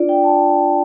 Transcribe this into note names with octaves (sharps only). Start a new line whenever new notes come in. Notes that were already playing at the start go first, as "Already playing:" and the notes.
Already playing: D4 F4 D5
G5
A5